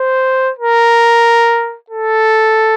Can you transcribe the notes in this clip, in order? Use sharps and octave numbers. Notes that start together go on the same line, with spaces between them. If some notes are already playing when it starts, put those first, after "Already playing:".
Already playing: C5
A#4
A4